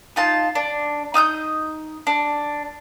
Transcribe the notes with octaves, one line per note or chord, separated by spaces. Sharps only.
D#4 F4 A5
D4
D#4 D#6 E6 G6
D4